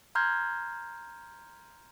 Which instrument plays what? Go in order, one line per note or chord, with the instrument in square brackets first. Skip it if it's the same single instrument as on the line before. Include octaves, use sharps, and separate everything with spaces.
[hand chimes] A#5 C6 F6 G6 G#6